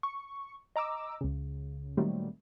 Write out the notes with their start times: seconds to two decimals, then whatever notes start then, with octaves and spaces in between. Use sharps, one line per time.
0.03 C#6
0.76 D#5 A#5 D6 E6
1.21 C#2 C#3
1.97 A#2 D#3 F#3 G3 A3 C4